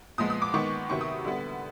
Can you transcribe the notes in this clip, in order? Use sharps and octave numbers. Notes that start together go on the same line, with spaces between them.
A#2 F3 G#3 B3 D#6
D#6
D6
D#3 G#3 B3 C#6
C3 D#3 F#3 B3 C#6
D#6
D3 G3 B3